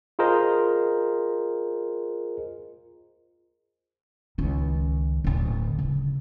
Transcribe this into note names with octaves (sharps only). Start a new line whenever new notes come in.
F4 G#4 A#4 C5 D#5
C#2 D#3
D1 D3
C#3